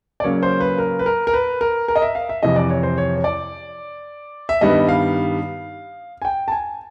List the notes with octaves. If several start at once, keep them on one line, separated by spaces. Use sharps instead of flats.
D5
C#3 F#3 A#3 C#4 C#5
C5
B4
A#4
B4
A#4
A#4
B4
A#4
A#4
D#5
E5
F5
E5
F2 C3 E3 D#5
D5
C#5
C5
C#5
C#5
D5
E5
G2 D#3 G3 B3 D#5
F5
G#5
G5
A5
G#5